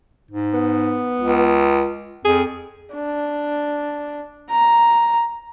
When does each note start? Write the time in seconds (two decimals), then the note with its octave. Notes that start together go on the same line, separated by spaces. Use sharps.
0.31 G#2
0.54 B3
1.20 C#2
2.25 F2 G#4
2.95 D4
4.50 A#5